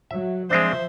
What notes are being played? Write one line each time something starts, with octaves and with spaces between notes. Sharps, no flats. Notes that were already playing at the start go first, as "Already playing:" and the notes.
F#3 E5
F3 G#3 C4 D4 C5 E5